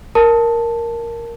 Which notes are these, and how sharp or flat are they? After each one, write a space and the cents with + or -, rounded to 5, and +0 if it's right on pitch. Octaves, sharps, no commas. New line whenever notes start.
A#4 +0 A5 +0